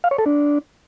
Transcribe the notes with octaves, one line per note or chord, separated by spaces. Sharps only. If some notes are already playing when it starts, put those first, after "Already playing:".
F5
C#5
A4
D4